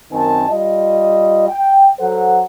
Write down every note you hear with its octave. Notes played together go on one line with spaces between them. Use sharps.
F#2 D#3 C4 G#5 A5
G3 F4 D#5
G5
F#3 A4 C5 F#5